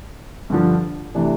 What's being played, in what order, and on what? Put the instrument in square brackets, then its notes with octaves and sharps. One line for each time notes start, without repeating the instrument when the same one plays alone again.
[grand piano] G2 D3 F3
C3 E3 A3 D4